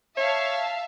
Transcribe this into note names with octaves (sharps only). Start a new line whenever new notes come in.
C#5 E5 F5 A5